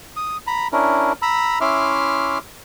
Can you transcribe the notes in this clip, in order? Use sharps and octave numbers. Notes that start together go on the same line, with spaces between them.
D#6
A#5 B5
C#4 D4 E4 A#4
A#5 B5 E6
C#4 E4 E5 C6 D6 F6